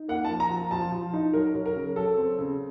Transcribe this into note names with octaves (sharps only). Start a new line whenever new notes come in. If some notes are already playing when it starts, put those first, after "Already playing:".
Already playing: D#4
A#3 F#5
A5
F3
A#5
F3
F3 A5
F3
D#4
F#3 A#4
F#3
A#4
C#3
F#3 A4
C4
C#3